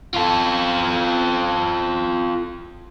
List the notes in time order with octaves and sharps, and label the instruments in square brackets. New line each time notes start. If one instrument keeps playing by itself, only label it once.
[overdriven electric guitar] F4 A4